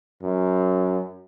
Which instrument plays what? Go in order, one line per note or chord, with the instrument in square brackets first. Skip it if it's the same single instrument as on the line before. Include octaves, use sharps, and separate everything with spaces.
[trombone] F#2